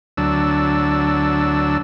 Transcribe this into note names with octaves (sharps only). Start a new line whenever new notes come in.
D2 F#3 D4 E6